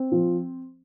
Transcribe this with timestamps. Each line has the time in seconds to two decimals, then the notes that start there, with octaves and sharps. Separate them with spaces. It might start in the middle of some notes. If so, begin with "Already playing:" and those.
Already playing: C4
0.12 F3